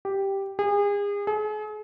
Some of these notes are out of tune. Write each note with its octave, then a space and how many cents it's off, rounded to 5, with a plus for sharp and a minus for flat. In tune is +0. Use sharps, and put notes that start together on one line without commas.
G4 +0
G#4 -35
G#4 +40